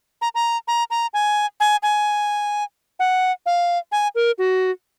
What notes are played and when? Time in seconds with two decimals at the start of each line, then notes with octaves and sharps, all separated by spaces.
0.22 A#5
0.35 A#5
0.68 A#5
0.90 A#5
1.14 G#5
1.60 G#5
1.83 G#5
2.99 F#5
3.46 F5
3.92 G#5
4.15 A#4
4.38 F#4